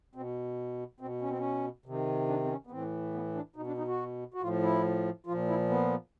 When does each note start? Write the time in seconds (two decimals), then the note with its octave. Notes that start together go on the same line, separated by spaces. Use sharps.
0.15 B2 C4
1.00 B2 C4
1.21 C#4
1.30 C4
1.38 C#4
1.86 C3 D#3
2.28 D4
2.45 C4
2.50 C#4
2.67 B3
2.71 A2 E3 C4
3.14 B3
3.35 D4
3.56 B2 D#4
3.67 D4
3.78 D#4
3.88 F#4
4.34 F#4
4.41 A2 F3 F4
4.63 E4
5.27 A#2 F3 F4
5.48 E4
5.69 B3